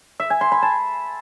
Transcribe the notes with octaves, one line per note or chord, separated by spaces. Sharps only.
E5
G#5
C6
B5
A5